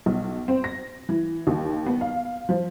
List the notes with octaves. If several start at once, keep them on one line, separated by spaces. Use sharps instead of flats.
B1
C4
A#6
E3
D#2
B3
F5
F3